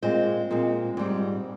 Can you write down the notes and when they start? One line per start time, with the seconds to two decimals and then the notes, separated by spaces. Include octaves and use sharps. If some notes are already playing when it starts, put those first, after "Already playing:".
0.02 A#2 G#3 C4 C5
0.51 A#2 G#3 C4
0.97 G#2 G3 C4